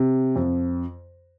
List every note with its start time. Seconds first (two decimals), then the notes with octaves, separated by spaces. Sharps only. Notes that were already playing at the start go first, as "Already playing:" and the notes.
Already playing: C3
0.36 F2